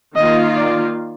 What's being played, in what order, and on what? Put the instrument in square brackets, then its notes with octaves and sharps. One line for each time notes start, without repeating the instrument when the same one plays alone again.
[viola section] D#3 A#3 F4 [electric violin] D#5
[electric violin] D5